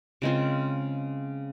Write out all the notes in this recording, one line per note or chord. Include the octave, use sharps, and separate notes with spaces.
C#3 G#3 C4 F4